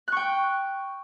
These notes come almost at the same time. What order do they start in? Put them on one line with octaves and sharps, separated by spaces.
F#6 C#6 G5